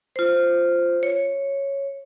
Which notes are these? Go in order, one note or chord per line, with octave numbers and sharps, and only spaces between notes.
F4 C5
C#5